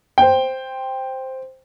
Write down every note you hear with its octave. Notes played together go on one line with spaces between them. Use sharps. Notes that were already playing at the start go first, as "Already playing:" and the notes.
C5 G5